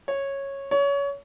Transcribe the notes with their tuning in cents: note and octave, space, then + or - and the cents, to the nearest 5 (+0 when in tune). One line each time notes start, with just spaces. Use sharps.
C#5 -10
C#5 +25